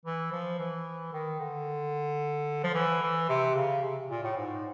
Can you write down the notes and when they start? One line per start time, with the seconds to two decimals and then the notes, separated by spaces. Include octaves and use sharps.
0.05 E3
0.32 F3
0.58 E3
1.13 D#3
1.40 D3
2.64 F3
2.74 E3
3.02 E3
3.29 C3
3.55 C#3
3.82 C3
4.10 A#2
4.23 A2
4.37 G#2